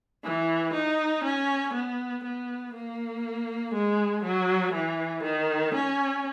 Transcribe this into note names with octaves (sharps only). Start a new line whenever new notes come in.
E3
D#4
C#4
B3
B3
A#3
G#3
F#3
E3
D#3
C#4